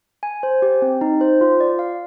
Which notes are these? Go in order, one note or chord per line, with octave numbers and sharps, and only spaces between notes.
G#5
C5
G4
C4
D#4
C5
F4
D5
F5